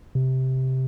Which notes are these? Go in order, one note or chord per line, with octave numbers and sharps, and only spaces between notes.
C3